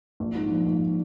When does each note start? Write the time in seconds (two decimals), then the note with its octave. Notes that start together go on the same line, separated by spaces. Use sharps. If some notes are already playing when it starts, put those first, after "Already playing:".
0.20 A#1
0.35 G#2
0.51 F3
0.66 A#1